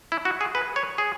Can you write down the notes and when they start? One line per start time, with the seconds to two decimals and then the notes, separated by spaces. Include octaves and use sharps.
0.12 E4
0.25 F#4
0.41 G#4
0.55 B4
0.76 C#5
0.98 G#4